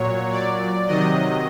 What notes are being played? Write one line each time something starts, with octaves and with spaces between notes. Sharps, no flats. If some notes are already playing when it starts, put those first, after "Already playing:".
Already playing: A#2 F#3 C#5
D5
C3 D#3 F#3 D#5